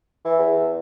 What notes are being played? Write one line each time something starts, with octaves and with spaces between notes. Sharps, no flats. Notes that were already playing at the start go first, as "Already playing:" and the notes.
E3
E2